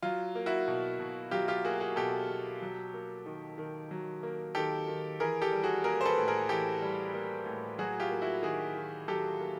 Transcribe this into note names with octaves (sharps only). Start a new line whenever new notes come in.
F#3 F4
A#3
E4 F#4
B2
B2
F#3 F4 G4
F4 G4
A#3 F#4 G#4
F#4 G#4
B2 G4 A4
B2
F#3
A#3
D#3
D#3
F#3
A#3
D#3 G4 A4
D#3
E3 G#4 A#4
G4 A4
G3
F#4 G#4
A#3 G#4 A#4
C5
A4 B4
A2
G#4 A#4
E3 G4 A4
G3
A#3
A2
F#3 F#4 G#4
F4 G4
A#3
E4 F#4
D#3 F#4 G#4
D#3
F#3 G4 A4
A#3